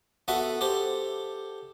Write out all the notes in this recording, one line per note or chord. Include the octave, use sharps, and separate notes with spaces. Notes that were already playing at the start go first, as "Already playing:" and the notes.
B3 F#4 A4 B4 E5
G4 A4 C5